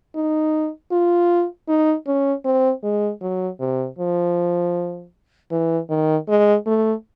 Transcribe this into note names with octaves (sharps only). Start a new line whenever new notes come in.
D#4
F4
D#4
C#4
C4
G#3
F#3
C3
F3
E3
D#3
G#3
A3